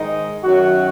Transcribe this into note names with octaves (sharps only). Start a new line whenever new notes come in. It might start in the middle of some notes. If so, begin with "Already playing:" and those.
Already playing: G#2 D#3 G#3 D#4
F#2 D#3 F#3 F#4